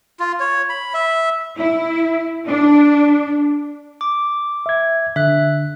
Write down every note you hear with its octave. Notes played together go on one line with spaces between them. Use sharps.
F4
C#5
B5
E5
E4
D4
D6
E5 G#6
D3 E5 F#6